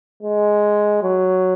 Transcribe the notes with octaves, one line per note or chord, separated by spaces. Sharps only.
G#3
F#3